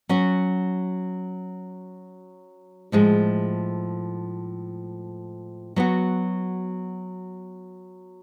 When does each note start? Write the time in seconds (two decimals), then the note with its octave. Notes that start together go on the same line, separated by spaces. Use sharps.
0.09 F#3 C#4 F#4
2.92 A2 F3 G#3
5.76 F#3 B3 F#4